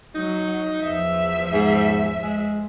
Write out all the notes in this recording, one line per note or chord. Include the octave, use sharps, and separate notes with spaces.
F#3 D#4
E2 F3 E5
G#2
G#3